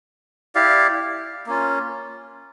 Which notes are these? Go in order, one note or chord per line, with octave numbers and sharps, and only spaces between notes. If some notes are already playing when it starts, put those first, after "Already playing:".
E4 G4 D5 F5
A#3 C#4 F4